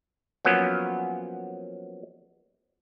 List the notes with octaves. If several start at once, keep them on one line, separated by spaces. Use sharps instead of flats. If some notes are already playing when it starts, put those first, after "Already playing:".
F3 F#3 A#3 B3 C#4